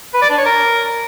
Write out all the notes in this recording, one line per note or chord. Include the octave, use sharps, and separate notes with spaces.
B4
D5
D4
C#5
A#4